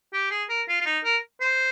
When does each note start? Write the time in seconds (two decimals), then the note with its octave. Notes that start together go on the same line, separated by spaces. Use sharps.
0.13 G4
0.31 G#4
0.49 A#4
0.68 F4
0.80 F4
0.86 D#4
1.04 A#4
1.41 C5